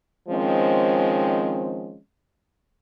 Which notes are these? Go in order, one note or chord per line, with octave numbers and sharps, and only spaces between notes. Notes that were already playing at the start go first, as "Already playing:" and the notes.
D#3 F3 G#3 C4 C#4